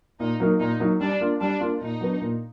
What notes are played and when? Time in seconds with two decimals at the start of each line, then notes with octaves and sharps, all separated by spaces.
0.20 A#2 D#4
0.40 F#3 A#3 D#4
0.60 A#2 D#4
0.80 F#3 A#3 D#4
1.01 G3 D4
1.20 A#3 D4 F4
1.40 G3 D4
1.60 A#3 D4 F4
1.81 A#2 D#4
2.01 F#3 B3 D4
2.21 A#2